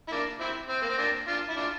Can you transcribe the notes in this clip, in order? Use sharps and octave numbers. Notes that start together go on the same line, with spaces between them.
E4
A#3 D4
C4 E4
C4
A#3
C4
A#3 D4
D4 F4
E4
D4 F4